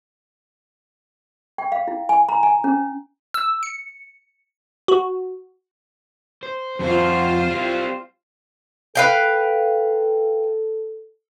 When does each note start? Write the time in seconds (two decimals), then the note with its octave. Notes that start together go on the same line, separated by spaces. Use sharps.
1.58 G5
1.72 F5
1.88 E4
2.09 G#5
2.29 A#5
2.43 G#5
2.64 C#4
3.34 E6
3.63 C#7
4.88 F#4
6.43 C5
6.79 F2 F4 F#4 C5
7.50 G3 C4
8.95 A4 B4 F5 G5